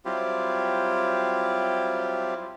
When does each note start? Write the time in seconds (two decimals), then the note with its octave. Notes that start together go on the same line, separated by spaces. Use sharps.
0.05 F#3 G3 C4 E4 F4 G4